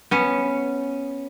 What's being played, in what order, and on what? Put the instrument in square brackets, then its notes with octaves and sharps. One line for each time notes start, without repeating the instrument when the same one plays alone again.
[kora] B3 C#4